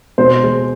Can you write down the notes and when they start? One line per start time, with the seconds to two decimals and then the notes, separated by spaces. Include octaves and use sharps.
0.18 B2 C5
0.43 G#3